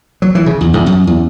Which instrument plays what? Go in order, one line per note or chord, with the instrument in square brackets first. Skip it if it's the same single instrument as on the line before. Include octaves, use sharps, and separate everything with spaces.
[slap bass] F#3
E3
C#3
E2
E2
F#2
E2